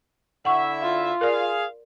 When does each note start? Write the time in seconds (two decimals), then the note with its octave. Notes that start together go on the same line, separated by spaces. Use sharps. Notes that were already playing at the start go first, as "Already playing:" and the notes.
0.45 D3 E4 E5 F#5 C#6
0.82 F4
1.21 G#4 A#4 D5 F5